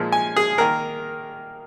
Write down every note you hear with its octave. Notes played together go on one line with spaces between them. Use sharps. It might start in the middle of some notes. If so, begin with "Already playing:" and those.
Already playing: A#2 F3 G#3
G#5
G#4
D#3 A#3 A#4